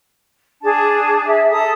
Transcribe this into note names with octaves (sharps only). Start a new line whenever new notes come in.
D4 G#4 A5
E5
A4 A5 A#5 D#6